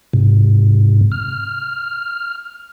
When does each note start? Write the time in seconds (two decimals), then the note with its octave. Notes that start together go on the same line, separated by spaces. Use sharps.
0.13 G#2 C3
1.12 F6